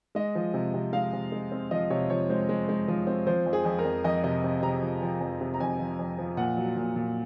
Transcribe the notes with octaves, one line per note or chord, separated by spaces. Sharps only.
G#3 D#5
F3
C3
C3
G#3 F5
C3
G#3
C4
F3 D#5
C3 C#5
F3 C#5
G#3 C5
G#3
G#3
F3
C4
F3 C5
F2
G#4
F2
A#4
F2
F2 D#5
C3 D#5
C3
C3 A#5
F3
F3
F2
C3
A#5
F2 G#5
F3
F2
F3
A#2 F#5
F#3
A#2
A#2